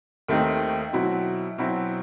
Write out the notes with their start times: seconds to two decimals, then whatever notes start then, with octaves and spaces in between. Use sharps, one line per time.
0.28 D#2 D#3 A3 C4 D#4
0.93 B2 F#3 C4 E4
1.58 B2 F#3 C4 E4